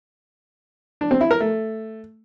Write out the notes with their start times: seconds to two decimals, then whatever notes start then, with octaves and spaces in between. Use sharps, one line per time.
1.01 D4
1.11 C4
1.21 E4
1.31 A#4
1.40 A3